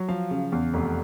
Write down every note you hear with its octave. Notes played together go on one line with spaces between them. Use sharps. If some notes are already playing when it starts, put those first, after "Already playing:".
Already playing: F#3
F3 F5
C#3
E2
F1